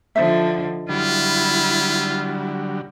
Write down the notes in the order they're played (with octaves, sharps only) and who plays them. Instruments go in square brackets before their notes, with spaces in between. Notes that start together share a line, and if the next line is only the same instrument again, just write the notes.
[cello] D3 F3 [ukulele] D#4 C5 E5
[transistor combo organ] D3 F#3 G3 [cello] E4 [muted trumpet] F4